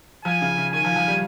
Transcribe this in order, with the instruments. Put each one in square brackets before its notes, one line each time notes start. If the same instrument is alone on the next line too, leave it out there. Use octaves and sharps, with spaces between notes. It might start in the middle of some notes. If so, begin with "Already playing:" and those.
[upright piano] F3 [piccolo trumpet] G#5
[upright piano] C#3
C#3
[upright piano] D#3 [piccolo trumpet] G#5
[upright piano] F3
F3
G3